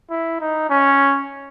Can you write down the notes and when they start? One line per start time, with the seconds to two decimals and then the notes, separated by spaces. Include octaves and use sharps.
0.10 E4
0.41 D#4
0.70 C#4